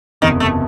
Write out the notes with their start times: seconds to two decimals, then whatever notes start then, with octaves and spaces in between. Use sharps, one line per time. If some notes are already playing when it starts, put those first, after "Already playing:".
0.22 F#1 E2 C3 D#3
0.40 A3